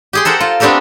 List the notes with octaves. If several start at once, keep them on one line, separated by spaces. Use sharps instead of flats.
G4 G#4 C6
A4 A#4 C5 F#5 G5
F4
B3 C4 D4 G4 A4 A#4